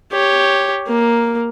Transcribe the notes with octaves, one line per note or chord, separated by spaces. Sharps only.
G4 C#5
A#3